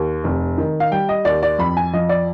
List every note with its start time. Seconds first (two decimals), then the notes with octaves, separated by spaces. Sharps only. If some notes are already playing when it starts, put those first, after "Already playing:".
Already playing: D#2
0.24 F1
0.58 D#3
0.80 F5
0.91 G3 G5
1.09 D#5
1.25 D#2 D5
1.43 D5
1.59 F2 B5
1.77 G#5
1.94 F3 D#5
2.09 D5